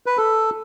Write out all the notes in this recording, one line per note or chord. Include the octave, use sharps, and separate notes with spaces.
B4
A4